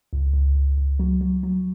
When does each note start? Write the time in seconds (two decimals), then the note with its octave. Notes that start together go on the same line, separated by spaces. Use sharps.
0.13 C#2
0.34 C#2
0.55 C#2
0.78 C#2
0.99 F#3
1.21 F#3
1.43 F#3